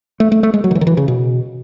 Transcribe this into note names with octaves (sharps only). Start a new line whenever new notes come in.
A3
A3
A3
G#3
F#3
D#3
E3
D#3
E3
C#3
B2